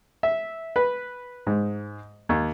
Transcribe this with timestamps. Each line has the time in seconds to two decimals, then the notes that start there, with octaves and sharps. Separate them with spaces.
0.23 E5
0.76 B4
1.47 G#2
2.29 D#2